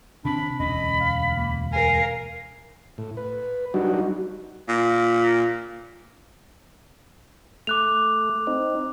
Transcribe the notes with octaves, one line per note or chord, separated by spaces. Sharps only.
C3 D#3 C4 D4 B5
E1 D2 C#4 D#5 B5
F5
A#3
A#4 F5 G#5
A2
B4
F#3 G3 D4 D#4 F#4
A#2
A3 D6 F#6 F7
C4 D#4